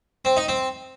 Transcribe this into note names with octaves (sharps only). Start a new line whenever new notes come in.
C4
D#4
C4